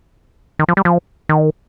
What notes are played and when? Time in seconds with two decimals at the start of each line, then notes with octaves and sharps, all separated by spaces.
0.59 D#3
0.68 F3
0.77 G3
0.85 F3
1.29 D#3